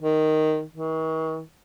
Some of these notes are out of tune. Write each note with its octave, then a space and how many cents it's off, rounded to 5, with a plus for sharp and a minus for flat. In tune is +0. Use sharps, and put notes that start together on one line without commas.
D#3 +0
D#3 +45